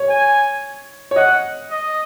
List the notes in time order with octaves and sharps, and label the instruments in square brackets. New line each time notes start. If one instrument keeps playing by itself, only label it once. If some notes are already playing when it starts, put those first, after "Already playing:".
Already playing: [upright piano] C#5
[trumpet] G#5
[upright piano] C#5
[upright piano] D#5 [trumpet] F#5
[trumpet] D#5